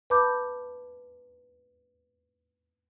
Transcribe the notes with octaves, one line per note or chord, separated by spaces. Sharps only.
B4 A5 B5 D6 G6